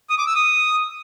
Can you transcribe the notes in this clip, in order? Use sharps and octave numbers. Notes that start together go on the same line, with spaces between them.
D#6
D6
E6
D#6